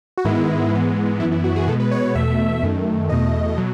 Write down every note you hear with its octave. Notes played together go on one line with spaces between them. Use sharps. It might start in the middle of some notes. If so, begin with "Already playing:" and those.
F#4
G#2 D#3 G#3 B3 E4
G#2 E3 G#3 B3
F#2 E3 B3 E4
E4
F#4
G#4
B2 G#3 B3 A4
B4
C#5
C#5
E2 B2 A3 E5
F#2 D#3 A3
E2 B2 A3 D#5
B2 F#3